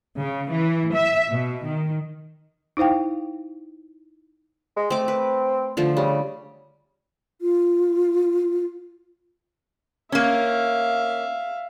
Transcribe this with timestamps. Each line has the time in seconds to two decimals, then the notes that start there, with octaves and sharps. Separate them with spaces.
0.19 C#3
0.53 E3
0.95 E5
1.29 B2
1.65 D#3
2.77 D#4 E4 C5 F5 G5
4.77 G#3
4.90 A3 C4 D6
5.08 B4
5.77 D3 F3 A3
5.97 C#3 G3
7.41 F4
10.12 A#3 C#4 E5 F5